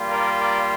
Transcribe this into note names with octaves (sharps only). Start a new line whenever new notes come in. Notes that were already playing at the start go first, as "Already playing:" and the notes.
Already playing: G3 A#3 F4
A#4 D5
A#4 D5